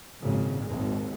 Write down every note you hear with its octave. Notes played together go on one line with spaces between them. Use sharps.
G#1 F2 A#2 C#3
G#1 D#2 G#3